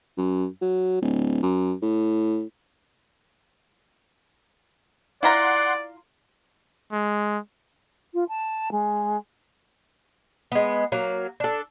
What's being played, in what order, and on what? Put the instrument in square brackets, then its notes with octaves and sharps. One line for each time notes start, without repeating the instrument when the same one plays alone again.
[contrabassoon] F#2
F#3
D1
F#2
A2
[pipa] E4 F4 A#5 [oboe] D5 [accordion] F#5 C6
[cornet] G#3
[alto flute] F4
A5
G#3
[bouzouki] G#3 B3
F#3 A#3
D4 A4